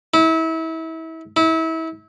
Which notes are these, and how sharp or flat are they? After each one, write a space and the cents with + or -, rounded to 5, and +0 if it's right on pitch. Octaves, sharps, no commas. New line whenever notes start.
E4 -30
E4 -30